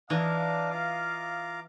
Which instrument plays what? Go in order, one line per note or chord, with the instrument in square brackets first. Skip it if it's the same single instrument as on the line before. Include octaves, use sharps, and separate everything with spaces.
[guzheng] E3 [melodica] D4 A#5 D6 [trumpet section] D#5 F5
[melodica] F4 A#5 D6